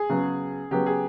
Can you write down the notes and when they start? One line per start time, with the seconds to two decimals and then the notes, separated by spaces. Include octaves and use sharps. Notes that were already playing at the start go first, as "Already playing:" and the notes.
Already playing: G#4
0.10 C#3 F#3 B3
0.71 C#3 F#3 B3 G4
0.86 G#4